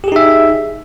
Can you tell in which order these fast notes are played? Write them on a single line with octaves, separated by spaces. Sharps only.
G4 G#4 D#4 E5